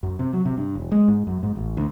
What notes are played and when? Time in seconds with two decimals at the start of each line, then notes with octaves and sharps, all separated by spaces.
0.03 F#2
0.19 C3
0.33 F#3
0.45 C3
0.57 G2
0.75 E1
0.92 G#3
1.08 G#2
1.27 F#2
1.43 G#2
1.55 A1
1.77 D2